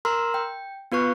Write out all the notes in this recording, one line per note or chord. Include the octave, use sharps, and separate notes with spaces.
A#4 A#5 C6 E6 F6
G5
B3 F4 B4 C#6 F#6